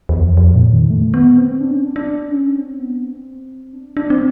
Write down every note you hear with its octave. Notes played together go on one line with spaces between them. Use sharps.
E2
F2
F2
A#2
D#3
A3
B3
C4
D4
C#4
D4
D4
C#4
C4
B3
C4
D4
D4
C4